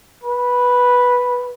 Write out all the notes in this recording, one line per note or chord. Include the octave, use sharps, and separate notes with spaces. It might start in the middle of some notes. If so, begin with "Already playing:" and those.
B4